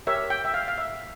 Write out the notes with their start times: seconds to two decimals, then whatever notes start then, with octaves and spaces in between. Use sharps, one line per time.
0.07 G4 A#4 C#5 E5
0.30 G5
0.45 E5
0.54 F5
0.68 F5
0.78 E5